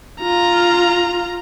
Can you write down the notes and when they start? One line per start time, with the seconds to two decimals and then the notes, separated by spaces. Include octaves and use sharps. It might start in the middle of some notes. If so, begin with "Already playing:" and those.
0.20 F4 A#5